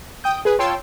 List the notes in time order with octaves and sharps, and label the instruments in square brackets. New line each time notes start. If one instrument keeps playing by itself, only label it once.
[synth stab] G5 D#6 G6
G#4 B4
F4 C#5 G5 A5 C6 E6